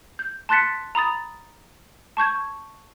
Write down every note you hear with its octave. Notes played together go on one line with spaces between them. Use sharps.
G6
A5 C6 F#6 A6 B6 C#7
A#5 B5 D#6 A6
A5 C#6 G6 G#6